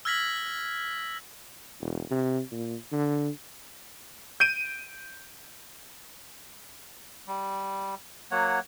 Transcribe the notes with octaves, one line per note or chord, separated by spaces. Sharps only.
E6 F6 G#6 A#6 B6 F#7
E1
C3
A#2
D3
G6 D7 D#7
G3
F#3 A#3 C#5 F#5